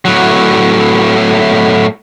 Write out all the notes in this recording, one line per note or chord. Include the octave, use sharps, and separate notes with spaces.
A2 F#3